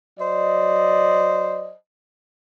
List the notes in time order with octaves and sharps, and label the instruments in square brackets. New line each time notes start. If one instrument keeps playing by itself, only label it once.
[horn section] F#3 C5 D5 D#5